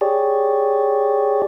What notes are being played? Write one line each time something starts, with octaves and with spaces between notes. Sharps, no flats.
G4 G#4 C#5 D5